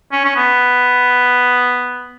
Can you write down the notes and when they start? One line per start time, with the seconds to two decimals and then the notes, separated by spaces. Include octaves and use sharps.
0.12 C#4
0.25 C#4
0.36 B3